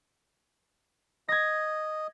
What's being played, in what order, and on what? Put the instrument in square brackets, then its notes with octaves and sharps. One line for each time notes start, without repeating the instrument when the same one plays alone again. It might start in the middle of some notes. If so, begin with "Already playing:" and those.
[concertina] D#5 [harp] G#6 A#6